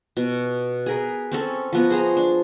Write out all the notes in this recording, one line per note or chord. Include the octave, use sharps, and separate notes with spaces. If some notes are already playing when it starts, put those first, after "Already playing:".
B2
G#4 A#4 B4
C4 C#4 A4
F3 B3 F#4
G#4 C5 A#5
D4